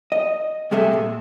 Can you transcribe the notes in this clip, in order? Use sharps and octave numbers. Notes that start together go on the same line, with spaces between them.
D#5
C2 C3 G#3 A3 A4 E5
A#2